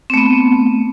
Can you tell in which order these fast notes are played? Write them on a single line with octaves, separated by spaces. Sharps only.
C4 A3 B3